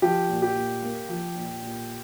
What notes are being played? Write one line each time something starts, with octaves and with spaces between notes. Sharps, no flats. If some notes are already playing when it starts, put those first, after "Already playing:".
F3 G4
A#2
G4
A#2
A#3
F3
A#2
A#2